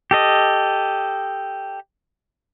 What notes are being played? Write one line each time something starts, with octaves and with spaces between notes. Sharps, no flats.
G4 A4 D#5